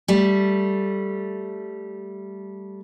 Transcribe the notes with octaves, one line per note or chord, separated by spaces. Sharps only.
G3 A3